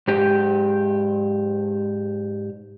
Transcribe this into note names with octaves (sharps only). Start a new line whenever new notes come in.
G#2 G4